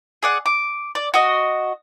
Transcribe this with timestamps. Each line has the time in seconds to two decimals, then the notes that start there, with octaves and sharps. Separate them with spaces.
0.23 G#4 D5 F#5
0.46 D6
0.95 D5
1.14 F#4 D#5